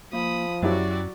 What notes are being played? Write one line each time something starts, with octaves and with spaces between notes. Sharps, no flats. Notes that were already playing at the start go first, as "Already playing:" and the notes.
F3 A#3 B5 D#6
F#2 F#3 E4 F#4 G4 D5